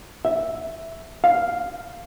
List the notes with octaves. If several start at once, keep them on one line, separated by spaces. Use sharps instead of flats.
E5
F5